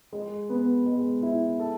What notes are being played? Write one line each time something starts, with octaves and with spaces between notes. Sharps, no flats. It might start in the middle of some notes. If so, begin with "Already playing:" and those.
G#3
B3
G#3
E4
A4